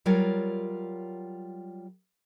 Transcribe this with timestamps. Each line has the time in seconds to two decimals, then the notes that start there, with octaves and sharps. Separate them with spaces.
0.06 F#3 G3 F4 A#4 C#5